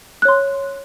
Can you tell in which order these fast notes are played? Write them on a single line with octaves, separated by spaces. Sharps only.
F#6 C#5 C6